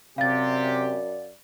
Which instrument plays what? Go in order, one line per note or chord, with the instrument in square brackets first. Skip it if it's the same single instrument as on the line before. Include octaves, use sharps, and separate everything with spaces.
[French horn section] F#2 D5 [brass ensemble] C3 G4 [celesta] F5 A6